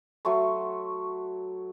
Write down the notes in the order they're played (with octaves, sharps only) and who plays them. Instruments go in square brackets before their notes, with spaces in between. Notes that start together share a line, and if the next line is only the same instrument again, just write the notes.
[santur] F#3 A3 C6 C#6